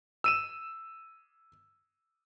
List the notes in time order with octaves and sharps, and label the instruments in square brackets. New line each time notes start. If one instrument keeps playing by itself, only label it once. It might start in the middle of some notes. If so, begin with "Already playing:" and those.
[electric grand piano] E6 D#7 E7